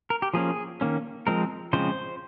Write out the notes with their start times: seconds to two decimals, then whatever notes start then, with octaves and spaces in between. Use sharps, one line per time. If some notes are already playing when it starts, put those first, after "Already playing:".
0.10 A#4
0.22 G4
0.34 F3 A#3 C#4 G#4
0.81 D#3 A#3 C#4
1.27 F3 G#3 C4 A#4
1.73 C#3 F3 G#3 C4 C5